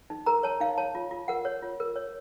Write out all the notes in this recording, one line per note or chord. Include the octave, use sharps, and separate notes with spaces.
D#4
A#4 A#5
C#5 A5
D#4 F5
C#5 A5
F4
F4
A#4 F#5
C#5
F4
A#4
C#5